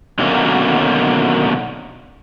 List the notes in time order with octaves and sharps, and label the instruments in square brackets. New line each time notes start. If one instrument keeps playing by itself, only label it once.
[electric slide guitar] B2 D3 D#3 F#3 A#3 C#4